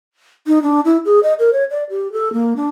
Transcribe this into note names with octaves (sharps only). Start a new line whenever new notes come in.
D#4
D4
E4
G#4
D#5
A#4
C#5
D5
G4
A4
A#3
D4